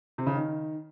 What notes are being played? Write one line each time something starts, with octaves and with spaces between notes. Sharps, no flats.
C3
C#3
D#3